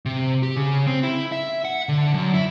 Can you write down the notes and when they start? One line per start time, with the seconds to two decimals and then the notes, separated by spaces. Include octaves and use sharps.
0.06 C3
0.43 G4
0.57 C#3
0.87 C4
1.03 E4
1.32 E5
1.65 F#5
1.89 D3
2.14 F#2
2.34 E4